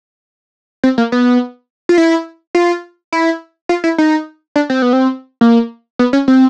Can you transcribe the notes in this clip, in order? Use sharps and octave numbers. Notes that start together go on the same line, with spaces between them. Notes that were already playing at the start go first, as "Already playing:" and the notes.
C4
A#3
B3
F4
E4
F4
E4
F4
E4
D#4
D4
C4
B3
C4
A#3
B3
C#4
C4